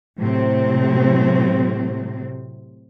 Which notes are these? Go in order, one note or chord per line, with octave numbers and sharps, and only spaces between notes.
A2 C3 F#3 C4